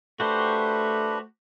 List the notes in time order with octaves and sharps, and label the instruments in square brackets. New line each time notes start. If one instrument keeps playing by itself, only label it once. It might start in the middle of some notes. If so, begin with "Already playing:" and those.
[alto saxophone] A3 [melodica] D4 B4 [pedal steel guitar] F#4 G4 C5